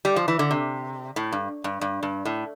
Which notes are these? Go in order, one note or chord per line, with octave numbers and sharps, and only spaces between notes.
G3
F3
E3
D3
C3
A2
G2
G2
G2
G2
A2